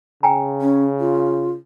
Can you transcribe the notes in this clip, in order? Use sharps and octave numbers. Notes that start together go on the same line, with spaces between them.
C#3 G5 G#5 A#5
C#4
F4